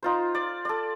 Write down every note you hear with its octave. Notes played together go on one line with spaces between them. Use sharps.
D#4 F4 C5
D5
A4 D5